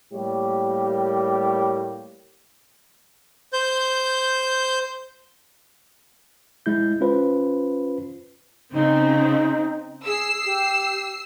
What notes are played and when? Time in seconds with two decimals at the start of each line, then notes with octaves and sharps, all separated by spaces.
0.12 A2 G3 A#3 G4
3.53 C5 G6
6.66 G#3 E4 G6
7.00 C#4 F4 B4 C5
8.73 C#3 C4 D#4
10.06 G#4 E6 C7
10.45 G4